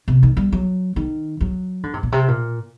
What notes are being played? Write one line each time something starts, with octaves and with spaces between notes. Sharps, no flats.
C3
D#3
G3
F#3
D#3
F#3
D3
C3
A#2
C3
A#2